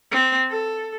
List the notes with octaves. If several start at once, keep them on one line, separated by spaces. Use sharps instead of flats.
C4
A4